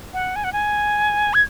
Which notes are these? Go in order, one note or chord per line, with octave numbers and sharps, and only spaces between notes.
F#5
G#5
F#5
G#5
G#6